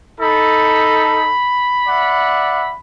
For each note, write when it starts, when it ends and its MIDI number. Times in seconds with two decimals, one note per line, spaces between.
0.21 1.34 63
0.21 1.34 69
0.21 2.76 83
1.87 2.73 74
1.87 2.73 76
1.87 2.73 78